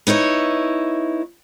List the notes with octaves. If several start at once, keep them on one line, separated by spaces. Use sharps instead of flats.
B3 D#4 E4 C#5